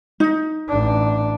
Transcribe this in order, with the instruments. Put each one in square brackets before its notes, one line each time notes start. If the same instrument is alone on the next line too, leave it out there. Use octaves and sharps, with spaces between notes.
[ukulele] D#4
[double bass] A1 D4